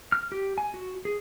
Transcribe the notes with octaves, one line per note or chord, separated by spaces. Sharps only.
F6
G4
G#5
F#4
G#4